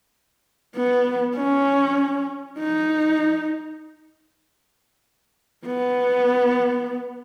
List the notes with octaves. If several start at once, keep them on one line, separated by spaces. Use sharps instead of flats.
B3
C#4
D#4
B3